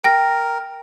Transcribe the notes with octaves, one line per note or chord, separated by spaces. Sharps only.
A#4 G5 A#6